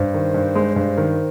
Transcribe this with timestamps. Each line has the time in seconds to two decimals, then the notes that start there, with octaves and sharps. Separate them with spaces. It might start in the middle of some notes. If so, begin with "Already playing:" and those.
Already playing: G2 C5
0.14 D#3
0.34 G2
0.55 G#3
0.76 G2 C5
0.97 D#3